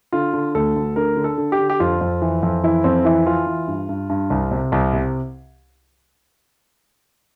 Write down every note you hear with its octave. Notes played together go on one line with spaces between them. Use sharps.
D3 F4
D3
D2 A4
D2
D3 A#4
D3
A4
D3
G4
D3
G4
F2 F4
F2
E3
F2
E3 E4
F2 C4
E3 E4
E3 F4
E3
G2
G2
G2
C2
C3
C2
C3